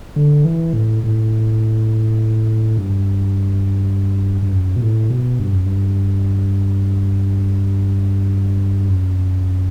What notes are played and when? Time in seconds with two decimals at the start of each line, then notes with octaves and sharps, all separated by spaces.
0.16 D3
0.45 E3
0.73 A2
1.04 A2
2.77 G2
4.42 G2
4.52 F#2
4.76 B2
4.81 A2
5.10 B2
5.39 G2
5.52 F#2
5.65 G2
8.89 F#2